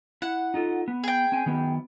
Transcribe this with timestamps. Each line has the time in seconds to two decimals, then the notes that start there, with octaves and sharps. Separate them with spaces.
0.22 E4 F#5
0.54 D#4 F4 A4
0.88 B3
1.04 G#4 G5
1.32 C4 G#5
1.46 D#3 F#3 B3